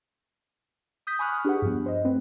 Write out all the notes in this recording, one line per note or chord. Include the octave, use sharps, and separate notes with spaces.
D#6 G6 B6
G#5 B5 C#6 D#6 F6 F#6
D4 G4 G#4 B4 F#5
G2 F3 B3
C5 D#5
A3 C4 B4